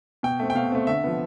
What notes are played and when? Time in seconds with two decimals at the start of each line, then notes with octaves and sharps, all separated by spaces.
0.23 B2 G5
0.39 A3 C4
0.50 G5
0.55 B2 F5
0.72 A3 C4
0.87 D3 E5
1.04 F3 B3